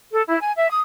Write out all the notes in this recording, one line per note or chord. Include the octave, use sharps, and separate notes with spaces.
A4
E4
G#5
E5
D#6